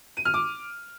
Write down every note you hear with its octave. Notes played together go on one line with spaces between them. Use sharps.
D#7
F6
D6